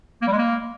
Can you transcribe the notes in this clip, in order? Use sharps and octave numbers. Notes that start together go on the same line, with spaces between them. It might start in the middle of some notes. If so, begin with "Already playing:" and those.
A#3
G3
G#3
A#3